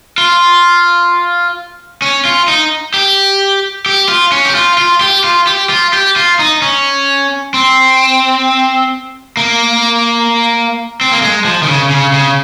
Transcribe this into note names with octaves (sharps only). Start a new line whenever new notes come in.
F4
C#4
F4
D#4
G4
G4
F4
C#4
G4
F4
F4
G4
F4
G4
F4
G4
F4
D#4
C#4
C4
A#3
C4
A#3
G#3
F3
D#3
C#3
C#3
C#3